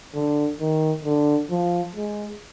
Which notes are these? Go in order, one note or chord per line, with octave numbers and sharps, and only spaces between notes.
D3
D#3
D3
F3
G#3